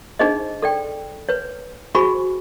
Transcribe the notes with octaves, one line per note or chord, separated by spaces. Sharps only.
D4 D#4 G#4 C5 D#5
A4 D5 G5
B4 C#5
F#4 G#4 C5 G#5 B5 C#6